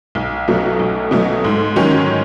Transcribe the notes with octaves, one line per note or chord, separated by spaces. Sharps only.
B1
B2 F#3 A3
B1
B2 F#3 A3
G#2
D#3 F#3 C#4